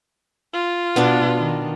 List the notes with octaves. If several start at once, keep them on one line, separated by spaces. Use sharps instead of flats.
F4
B2 B3 D4 D5
D#3